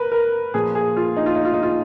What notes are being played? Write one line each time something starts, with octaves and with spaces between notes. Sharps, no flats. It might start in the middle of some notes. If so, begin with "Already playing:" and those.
Already playing: A#4 B4
A#4
A#2 F3 G#4
G#4
F4
D#4
F4
D#4
F4
D#4
F4